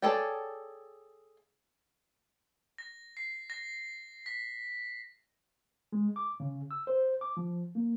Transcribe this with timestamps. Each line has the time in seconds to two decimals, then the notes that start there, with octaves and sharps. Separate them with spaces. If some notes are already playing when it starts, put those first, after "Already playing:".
0.02 G#4 A4 C#5 D5 G5
2.78 A#6
3.17 C7
3.50 A#6
4.26 B6
5.92 G#3
6.16 D6
6.40 C#3
6.71 E6
6.87 C5
7.21 D6
7.37 F3
7.75 A#3